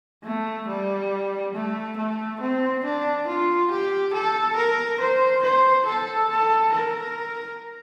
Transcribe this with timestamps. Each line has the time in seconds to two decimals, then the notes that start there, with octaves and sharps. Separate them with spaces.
0.23 A3
0.68 G3
1.54 A3
1.97 A3
2.41 C4
2.84 D4
3.28 F4
3.71 G4
4.14 A4
4.56 A#4
5.00 C5
5.43 C5
5.86 A4
6.29 A4
6.73 A#4